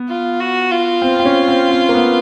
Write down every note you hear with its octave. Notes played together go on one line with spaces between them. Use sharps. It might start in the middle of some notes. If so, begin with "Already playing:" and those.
Already playing: B3
F4
F#4
F4
C4
C4
C#4
C4
C4
A#3
B3